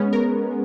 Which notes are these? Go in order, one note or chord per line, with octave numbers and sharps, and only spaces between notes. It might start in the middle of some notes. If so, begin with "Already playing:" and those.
Already playing: G#3 B3 C#4
A#4